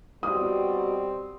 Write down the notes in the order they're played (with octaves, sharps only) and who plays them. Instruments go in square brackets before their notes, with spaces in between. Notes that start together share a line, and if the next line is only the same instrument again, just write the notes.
[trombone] B2 [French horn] G3 [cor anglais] C4 [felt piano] D#6